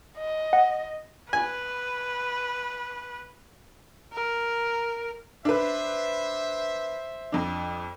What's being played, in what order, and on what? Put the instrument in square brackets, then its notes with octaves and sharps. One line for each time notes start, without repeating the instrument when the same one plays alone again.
[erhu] D#5
[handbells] F#5
[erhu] B4 [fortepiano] G#5
[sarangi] A#4
[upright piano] D4 B4 [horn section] C5 E5
[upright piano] F2 D4